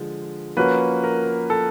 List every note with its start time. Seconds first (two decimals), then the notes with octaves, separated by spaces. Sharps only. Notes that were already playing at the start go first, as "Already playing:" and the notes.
Already playing: D3 F3 G#3
0.57 F3 A#3 C#4 F#4 B4
1.04 A#4
1.50 A4